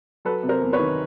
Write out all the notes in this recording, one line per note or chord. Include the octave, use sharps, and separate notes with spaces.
F#3 A4 B4
C3
A#4 C5
E2
B4 C#5
D#3